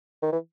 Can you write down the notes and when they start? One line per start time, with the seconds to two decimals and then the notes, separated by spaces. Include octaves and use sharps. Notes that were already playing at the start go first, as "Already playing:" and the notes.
0.23 D#3
0.32 E3